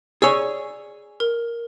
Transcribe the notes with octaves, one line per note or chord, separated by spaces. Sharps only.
G#4 C#5 D5 E6
A#4